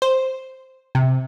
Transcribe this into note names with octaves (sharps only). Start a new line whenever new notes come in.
C5
C3